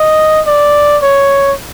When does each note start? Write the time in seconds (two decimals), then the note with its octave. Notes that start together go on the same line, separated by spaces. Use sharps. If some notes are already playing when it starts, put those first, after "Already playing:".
Already playing: D#5
0.47 D5
1.02 C#5